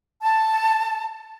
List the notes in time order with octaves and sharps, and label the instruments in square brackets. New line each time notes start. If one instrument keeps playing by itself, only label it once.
[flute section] A5